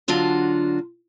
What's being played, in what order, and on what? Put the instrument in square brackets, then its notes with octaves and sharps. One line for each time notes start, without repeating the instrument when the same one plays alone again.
[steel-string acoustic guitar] D3 F#3 D4 F4 F#4